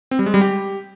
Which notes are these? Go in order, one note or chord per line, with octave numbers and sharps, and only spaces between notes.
C4
G3
G#3
G3
G4